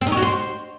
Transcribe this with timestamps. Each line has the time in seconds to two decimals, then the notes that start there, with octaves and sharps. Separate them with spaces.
0.01 C4
0.07 D#4
0.12 C#5
0.17 F#4
0.23 C5